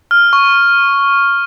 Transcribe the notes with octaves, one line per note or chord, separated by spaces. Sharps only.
F6
C#6